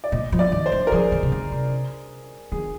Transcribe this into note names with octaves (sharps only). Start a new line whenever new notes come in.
D5
A#2 D#5
F3
D5
D#3
C5
F3
A#4
F3 G#4
D#3
C3
D3
C3
D#3 G#4